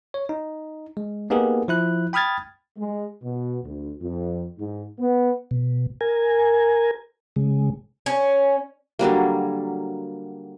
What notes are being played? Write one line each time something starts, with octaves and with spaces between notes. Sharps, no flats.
C#5
D#4
G#3
A#3 B3 D#4 G4 G#4 A#4
F3 E4 F#6
G5 B5 D#6 F6 G#6 A6
G#3
B2
D2
F2
G#2
B3
B2
A#4 G#5
C#3 G#3
C#4
D3 F#3 G3 A#3